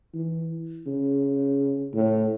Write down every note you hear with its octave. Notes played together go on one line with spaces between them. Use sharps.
E3
C#3
A2